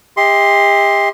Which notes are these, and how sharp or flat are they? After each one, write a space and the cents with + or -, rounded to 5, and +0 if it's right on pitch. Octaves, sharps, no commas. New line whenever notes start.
G4 +40 D#5 +40 C6 +0